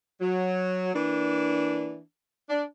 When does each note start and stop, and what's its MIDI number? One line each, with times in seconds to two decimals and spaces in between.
0.21 0.90 54
0.94 1.99 52
0.94 1.99 58
0.94 1.99 62
2.49 2.64 62